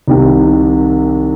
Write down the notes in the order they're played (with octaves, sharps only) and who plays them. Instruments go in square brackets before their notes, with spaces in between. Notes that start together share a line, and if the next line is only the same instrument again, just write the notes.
[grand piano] C2 C3 D#3 D#4